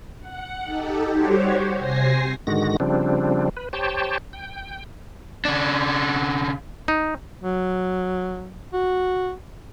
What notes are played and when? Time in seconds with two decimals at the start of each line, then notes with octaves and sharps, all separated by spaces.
0.20 F#5
0.62 D#4 G4 A4
1.11 G3 F#4 G4 C5 C#5
1.78 C3 C5 G#5 A#6 C7
2.47 G#2 D3 D#3 G#3 F#4 A#6
2.80 C#3 F3 G3 C4 D4
3.57 B4
3.73 G4 C5 C#5 G5 A5
4.33 G5
5.45 C#3 D4
6.88 D#4
7.42 F#3
8.73 F#4